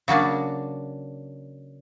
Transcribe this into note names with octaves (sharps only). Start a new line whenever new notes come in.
C#3 F#3 A#3 D4